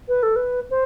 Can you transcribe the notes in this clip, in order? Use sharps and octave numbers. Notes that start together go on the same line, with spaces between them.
B4
A4
B4
C5